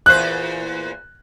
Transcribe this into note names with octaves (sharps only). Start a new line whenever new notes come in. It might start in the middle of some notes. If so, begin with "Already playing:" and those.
E2 A#2 C5 F#6